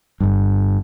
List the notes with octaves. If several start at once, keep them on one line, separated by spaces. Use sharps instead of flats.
G1 G2